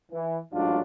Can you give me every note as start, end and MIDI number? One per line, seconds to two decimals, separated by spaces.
0.11 0.38 52
0.52 0.79 33
0.52 0.79 44
0.52 0.79 54
0.52 0.79 62
0.52 0.79 65